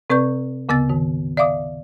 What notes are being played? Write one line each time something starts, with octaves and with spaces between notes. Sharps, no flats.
C3 C4 B4 D5 C#6 G6
D2 C#3 B3 E6 A6
G#2 D#3
D5 E5 F5 D6 D#6